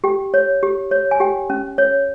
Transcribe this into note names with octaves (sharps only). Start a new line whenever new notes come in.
G4 G5
C#5
G4
C#5
G#5
G4 G5
C#4
C#5